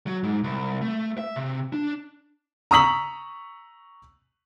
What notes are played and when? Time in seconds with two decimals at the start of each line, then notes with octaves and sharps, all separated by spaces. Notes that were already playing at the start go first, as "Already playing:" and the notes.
0.07 F#3
0.23 G#2
0.44 C2
0.81 A3
1.18 E5
1.36 C3
1.73 D4
2.71 A#5 C#6 D#6 E6 B6 F#7